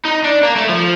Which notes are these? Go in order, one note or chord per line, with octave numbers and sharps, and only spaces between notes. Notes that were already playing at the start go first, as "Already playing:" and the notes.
D#4
D4
A#3
A3
F3